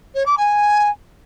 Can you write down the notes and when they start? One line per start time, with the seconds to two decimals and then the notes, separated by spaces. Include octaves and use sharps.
0.14 C#5
0.26 D6
0.37 G#5